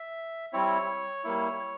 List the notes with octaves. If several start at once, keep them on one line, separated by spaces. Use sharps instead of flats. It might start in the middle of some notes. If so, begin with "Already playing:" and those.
Already playing: E5
G3 C4 E4 C#5
G3 A#3 E4